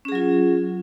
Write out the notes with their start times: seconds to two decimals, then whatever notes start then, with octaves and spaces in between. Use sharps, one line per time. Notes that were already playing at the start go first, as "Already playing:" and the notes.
0.05 C#4
0.08 G#4
0.12 F#3
0.15 F4